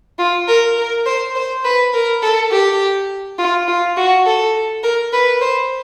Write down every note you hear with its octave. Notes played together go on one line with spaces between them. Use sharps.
F4
A#4
A#4
C5
C5
B4
A#4
A4
G4
F4
F4
F#4
A4
A#4
B4
C5